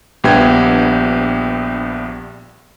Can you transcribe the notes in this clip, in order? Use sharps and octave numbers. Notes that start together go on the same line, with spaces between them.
A#1 G2 B3 G4 G5 G#6